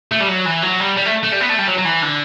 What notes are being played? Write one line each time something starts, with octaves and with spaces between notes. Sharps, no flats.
A3
G3
F#3
E3
F#3
G3
G3
A3
A3
G3
B3
A3
G3
F#3
F#3
E3
D3